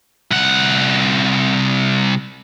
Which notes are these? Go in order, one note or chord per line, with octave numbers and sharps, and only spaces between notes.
C2 F#5